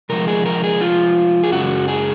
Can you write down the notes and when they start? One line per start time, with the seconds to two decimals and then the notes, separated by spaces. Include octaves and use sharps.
0.09 C3 F3 G#3 A#4
0.28 G#4
0.46 A#4
0.64 G#4
0.81 F4
1.44 G#4
1.52 F#2 C#3 G#3 F#4
1.88 G#4